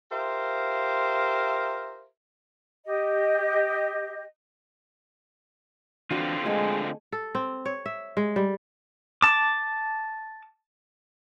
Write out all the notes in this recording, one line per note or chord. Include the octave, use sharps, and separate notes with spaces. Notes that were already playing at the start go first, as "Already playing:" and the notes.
F4 G4 A#4 C5 E5 F5
G4 D#5
D3 E3 C4 D4 F4 F#4
G#3 A3 G#4 D#5
A4
C4
C#5
E5
G#3
G3
A5 D6